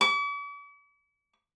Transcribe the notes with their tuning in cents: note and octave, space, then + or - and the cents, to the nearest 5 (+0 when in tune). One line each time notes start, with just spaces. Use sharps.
D6 -45